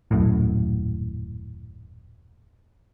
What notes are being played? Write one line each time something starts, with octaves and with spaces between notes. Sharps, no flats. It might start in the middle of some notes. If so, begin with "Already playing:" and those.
D#1 F#2 A2